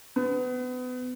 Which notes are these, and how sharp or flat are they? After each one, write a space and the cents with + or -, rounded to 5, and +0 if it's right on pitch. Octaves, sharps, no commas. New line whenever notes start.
B3 +30